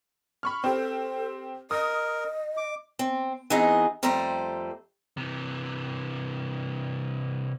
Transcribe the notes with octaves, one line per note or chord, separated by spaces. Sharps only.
B5 C#6 F6
C4 G4 A4 C5
A#4 D#5 D#6
D6
C4
E3 B3 C4 D#4 G#4 D#5
F2 G3 A3 A4 C5 A#5
C3 E3